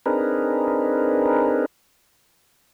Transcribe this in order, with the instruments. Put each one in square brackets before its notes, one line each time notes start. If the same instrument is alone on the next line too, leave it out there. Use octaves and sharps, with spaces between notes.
[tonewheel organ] C4 D4 D#4 G#4 A#4 B4